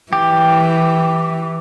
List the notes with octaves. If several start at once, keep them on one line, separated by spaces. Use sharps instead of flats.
E3 G4